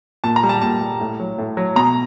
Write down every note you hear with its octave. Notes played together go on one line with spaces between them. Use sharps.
A#2 A5
A#5
G3
A5
A#2 A5
G3
A2
F#3
A2
F#3
B2 A#5